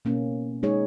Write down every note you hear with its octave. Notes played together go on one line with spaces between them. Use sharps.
B2 A#3 C#4
G#3 D#4 G#4 C#5